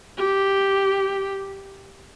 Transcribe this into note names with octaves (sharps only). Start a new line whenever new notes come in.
G4